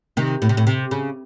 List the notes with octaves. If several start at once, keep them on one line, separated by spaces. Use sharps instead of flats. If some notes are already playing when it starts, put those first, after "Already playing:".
C3 D#3
A2
C3
A2
C3
C#3